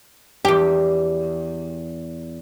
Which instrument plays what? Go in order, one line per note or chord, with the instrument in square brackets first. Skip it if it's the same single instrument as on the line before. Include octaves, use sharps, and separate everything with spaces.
[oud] E2 G4